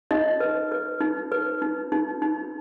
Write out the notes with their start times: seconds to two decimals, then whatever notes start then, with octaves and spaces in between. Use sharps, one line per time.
0.11 D#4 D#5
0.40 B4
0.72 B4
1.01 D#4
1.32 B4
1.62 D#4
1.92 D#4
2.22 D#4